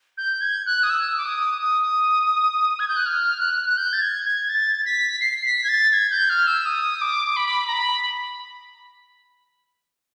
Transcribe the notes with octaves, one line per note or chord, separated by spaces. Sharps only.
G6
G#6
F#6
D#6
E6
D6
D#6
D#6
G#6
G6
F#6
F6
F#6
F#6
G6
A6
G#6
G#6
A6
B6
C7
B6
G#6
A6
G#6
G6
F6
E6
D#6
D6
B5
A#5
B5